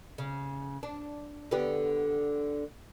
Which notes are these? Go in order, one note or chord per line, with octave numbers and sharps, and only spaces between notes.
C#3
D4
D3 B3 G4